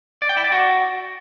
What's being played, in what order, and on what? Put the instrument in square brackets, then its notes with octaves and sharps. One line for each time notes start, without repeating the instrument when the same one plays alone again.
[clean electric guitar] D5
G5
E4
D5
F#4